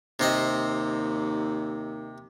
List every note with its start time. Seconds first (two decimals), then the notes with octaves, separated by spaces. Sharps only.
0.20 D#2 C3 C4 D#5